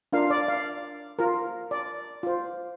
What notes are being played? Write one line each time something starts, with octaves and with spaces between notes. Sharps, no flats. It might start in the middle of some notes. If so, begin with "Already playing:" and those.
D4 F4 A#4 F5
D5
F5
F4 A#4
D5
F4 C5